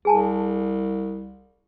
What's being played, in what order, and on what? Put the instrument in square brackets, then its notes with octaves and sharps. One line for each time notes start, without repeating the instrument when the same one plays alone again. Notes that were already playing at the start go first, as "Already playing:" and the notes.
[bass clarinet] C2 [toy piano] G#4 G#5 A5